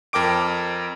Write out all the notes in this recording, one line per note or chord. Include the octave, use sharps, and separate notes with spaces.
F2 A#4 G5 D6 D7